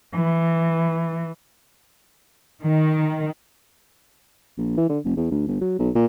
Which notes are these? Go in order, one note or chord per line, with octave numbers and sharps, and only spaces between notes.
E3
D#3
A#1
E3
D3
F1
E2
D2
G1
F#3
B1
A#2